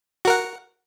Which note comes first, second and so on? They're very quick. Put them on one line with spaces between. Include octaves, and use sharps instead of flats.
F#4 A#4 F#5